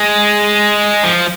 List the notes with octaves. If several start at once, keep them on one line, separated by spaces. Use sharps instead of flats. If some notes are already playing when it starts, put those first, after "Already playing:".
Already playing: G#3
F3